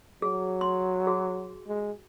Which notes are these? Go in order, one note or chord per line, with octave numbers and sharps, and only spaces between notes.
F#3 G#4
C6
F#4 G#4
G#3